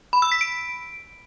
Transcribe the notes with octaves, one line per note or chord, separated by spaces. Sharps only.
B5
E6
B6
D7